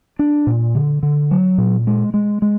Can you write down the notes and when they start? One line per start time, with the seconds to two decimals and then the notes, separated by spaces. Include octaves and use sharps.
0.19 D4
0.47 A#2
0.75 D3
1.03 D3
1.31 F#3
1.58 A#2
1.87 G#3
2.14 G#3
2.42 G#3